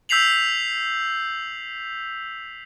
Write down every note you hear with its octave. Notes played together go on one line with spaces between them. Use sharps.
E6 G6 B6 C7 F7 F#7